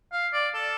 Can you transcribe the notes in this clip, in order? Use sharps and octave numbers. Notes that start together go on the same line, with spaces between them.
F5
D5
A4